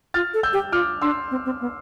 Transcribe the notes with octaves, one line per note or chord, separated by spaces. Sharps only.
F4 F6 A6
A4
E6 G6
G4
F4 D6 F6
D4 C6 E6
C4
C4
B3